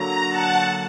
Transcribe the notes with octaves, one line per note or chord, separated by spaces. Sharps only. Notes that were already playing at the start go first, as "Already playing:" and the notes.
Already playing: D3 F#3 A#3 A#5
F#5 A5